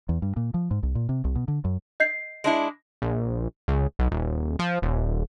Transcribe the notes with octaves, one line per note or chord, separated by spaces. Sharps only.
E2
G2
A#2
F3
G#2
C2
A#2
C3
C2
B2
D3
F#2
D#5 G6 C7
G#3 D4 E4
A#1
C#2
B1
D#1
F3
D#1